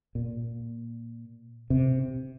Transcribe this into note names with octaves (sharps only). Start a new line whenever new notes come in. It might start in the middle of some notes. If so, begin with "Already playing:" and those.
A#2
C3